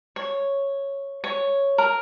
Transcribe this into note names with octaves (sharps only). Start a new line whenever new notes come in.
C#5
C#5
A#4